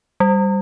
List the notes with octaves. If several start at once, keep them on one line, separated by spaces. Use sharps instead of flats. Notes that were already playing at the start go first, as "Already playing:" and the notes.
G3